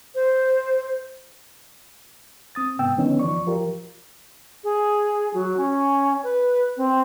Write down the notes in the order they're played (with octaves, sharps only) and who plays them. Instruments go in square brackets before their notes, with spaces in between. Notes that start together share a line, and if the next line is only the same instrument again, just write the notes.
[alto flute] C5
[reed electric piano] C4 D#6 A6
G#2 C3 B3 G5 E6
D3 D#3 F3 B3 C#4 D#4
E2 F3 D5 C#6
F3 F4 G4 A#4
[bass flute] G#4
F#3
C#4
B4
C4